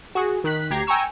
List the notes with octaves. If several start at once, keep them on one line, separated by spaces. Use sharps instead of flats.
F#4 G#4
D#3 F#6 B6
D2 G4 A#5 G#6 C7
G5 G#5 A#5 C#6 E6